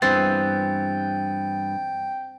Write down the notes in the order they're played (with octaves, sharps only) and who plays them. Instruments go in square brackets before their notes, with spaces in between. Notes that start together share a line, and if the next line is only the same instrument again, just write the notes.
[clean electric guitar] G2 E3 B3 [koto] C4 [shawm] G5 [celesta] A6